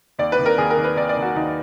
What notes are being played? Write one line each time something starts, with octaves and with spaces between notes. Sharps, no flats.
D#2 D5
B4
D#3
A#4
D#2 G#4
A#4
D#3
B4
D#2 D5
D5
D#3
F#4
D#2 D#4